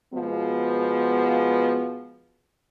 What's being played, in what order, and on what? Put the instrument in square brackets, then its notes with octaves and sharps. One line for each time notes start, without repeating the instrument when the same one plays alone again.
[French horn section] B2 F3 G#3 B3